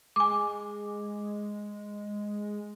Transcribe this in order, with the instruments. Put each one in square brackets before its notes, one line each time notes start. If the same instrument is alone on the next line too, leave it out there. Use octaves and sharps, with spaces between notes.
[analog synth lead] G#3 [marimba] G#5 D6